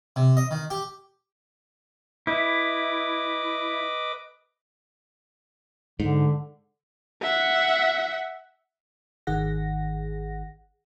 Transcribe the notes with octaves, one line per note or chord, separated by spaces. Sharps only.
C3
D#5
D#3
G4
E4 B4 D#5 D6
G#2 D3
E5 F#5
G#1 D#3 G#4 F#5 A#6